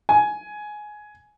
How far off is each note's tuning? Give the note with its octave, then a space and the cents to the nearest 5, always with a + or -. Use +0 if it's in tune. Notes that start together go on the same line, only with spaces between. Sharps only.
G#5 +15